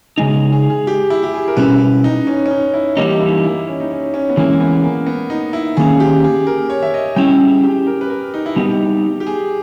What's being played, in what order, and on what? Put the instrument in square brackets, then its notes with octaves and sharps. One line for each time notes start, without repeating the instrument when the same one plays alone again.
[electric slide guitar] C#3 G#3 D#4 [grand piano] G#4
[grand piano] G#4
G#4
G#4
G4
E4
G4
G#4
A#4
[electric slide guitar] B2 G3 C#4 E4 [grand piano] B4
[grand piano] D#4
C#4
C#4
D#4
E4
[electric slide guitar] E3 G3 A#3 D#4 [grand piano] G4
[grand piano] E4
E4
C#4
D#4
C#4
C#4
B3
[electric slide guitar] E3 G#3 C#4 E4 [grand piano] A#3
[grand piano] B3
A#3
B3
D#4
E4
[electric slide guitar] D#3 A#3 C#4 [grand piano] G#4
[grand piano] G4
G#4
A#4
C#5
E5
D#5
[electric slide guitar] G3 C#4 E4 [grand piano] G5
[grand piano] G#4
G4
A#4
B4
A#4
D#4
E4
[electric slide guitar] G3 B3 D#4 [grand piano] G4
[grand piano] G4
G#4